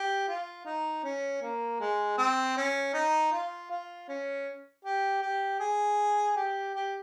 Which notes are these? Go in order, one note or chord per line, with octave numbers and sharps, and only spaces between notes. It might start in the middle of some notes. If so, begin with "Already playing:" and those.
Already playing: G4
F4
D#4
C#4
A#3
G#3
C4
C#4
D#4
F4
F4
C#4
G4
G4
G#4
G4
G4